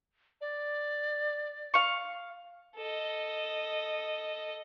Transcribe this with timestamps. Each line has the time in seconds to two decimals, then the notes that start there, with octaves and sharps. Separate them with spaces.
0.41 D5
1.74 F5 C#6
2.77 A4 D#5